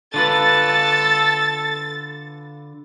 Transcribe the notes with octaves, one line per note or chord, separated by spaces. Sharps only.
D3 F4 A4 B4 A6